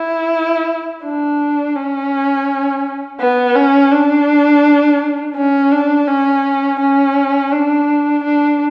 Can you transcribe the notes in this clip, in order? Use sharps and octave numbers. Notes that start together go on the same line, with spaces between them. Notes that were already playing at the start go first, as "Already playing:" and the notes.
Already playing: E4
D4
C#4
B3
C#4
D4
C#4
D4
C#4
C#4
D4
D4